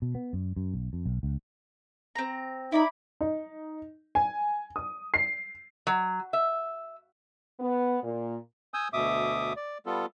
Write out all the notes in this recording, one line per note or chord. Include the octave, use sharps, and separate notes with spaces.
B2
B3
F#2
F#2
B1
F2
B1
C#2
C4 A#5
D#4 E4 D5 B5
D#4
G#5
D#6
C7
F#3
E5
B3
A#2
G#5 D#6 E6 G6
D2 B2 E5 D6 D#6
D5
G3 B3 F4 A4